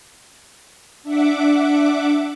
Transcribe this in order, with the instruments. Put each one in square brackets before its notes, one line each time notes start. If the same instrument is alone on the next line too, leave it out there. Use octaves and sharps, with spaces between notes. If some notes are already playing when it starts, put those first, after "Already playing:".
[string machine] D4 E5 F#5 D6